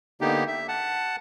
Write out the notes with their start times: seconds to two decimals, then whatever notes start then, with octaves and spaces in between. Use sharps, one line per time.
0.21 D3 A#3 B3 D#4 G4
0.47 E5
0.68 F#5 A5